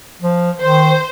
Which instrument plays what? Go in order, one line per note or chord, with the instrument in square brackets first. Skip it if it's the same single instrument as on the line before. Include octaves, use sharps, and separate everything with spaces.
[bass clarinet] F3
[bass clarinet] D#3 [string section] C5